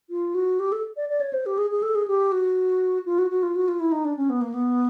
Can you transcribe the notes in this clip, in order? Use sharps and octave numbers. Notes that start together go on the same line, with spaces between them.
F4
F#4
G4
A4
D5
D5
C#5
C5
G4
G#4
G#4
A4
G#4
G4
F#4
F4
F#4
F#4
F4
F#4
F4
E4
D#4
D4
C#4
B3
A#3
B3